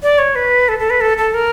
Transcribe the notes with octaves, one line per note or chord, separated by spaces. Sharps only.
D5
C#5
B4
A4
A4
B4
A4
A4
A#4